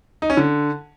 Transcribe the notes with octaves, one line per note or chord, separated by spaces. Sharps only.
D#4
C#4
D3